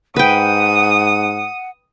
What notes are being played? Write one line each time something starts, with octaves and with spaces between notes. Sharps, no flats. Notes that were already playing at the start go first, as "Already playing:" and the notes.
G#2 B4 F#5 G5 D#6